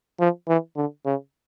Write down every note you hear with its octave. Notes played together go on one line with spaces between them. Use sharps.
F3
E3
D3
C#3